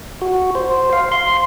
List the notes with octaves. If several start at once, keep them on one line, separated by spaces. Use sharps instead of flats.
F#4
C5
F5
C6